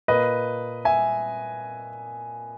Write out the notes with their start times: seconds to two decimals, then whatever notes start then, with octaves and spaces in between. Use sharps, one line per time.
0.08 A#2 A#3 B4 D#5
0.85 E5 G#5